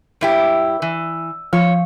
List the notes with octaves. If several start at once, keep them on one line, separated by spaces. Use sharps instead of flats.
G2 E4 G4
E3
F3 C#5 F5